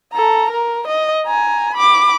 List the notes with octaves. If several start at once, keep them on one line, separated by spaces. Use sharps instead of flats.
A4 A#5
A#4
D#5
G#5 A#5
B5 D6